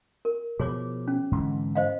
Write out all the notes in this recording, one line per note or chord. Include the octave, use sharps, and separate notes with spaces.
A#4
B2 F3 G#4 C#5 D6
C#4
G#2 D3 E3
C5 D#5 F5